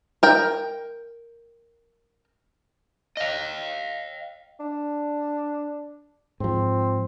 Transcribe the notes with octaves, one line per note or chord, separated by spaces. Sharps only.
A#4 G5
D#5 F5
D4
G#2 F3 C4